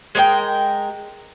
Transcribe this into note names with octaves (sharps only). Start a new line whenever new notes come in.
G#3 A#4 D5 G5